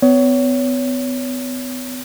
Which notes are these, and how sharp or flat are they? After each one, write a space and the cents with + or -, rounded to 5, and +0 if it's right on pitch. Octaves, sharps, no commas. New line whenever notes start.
B3 +40 C#5 +25